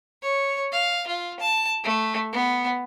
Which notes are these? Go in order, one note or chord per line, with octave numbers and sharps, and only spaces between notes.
C#5
F5
F4
A5
A3
B3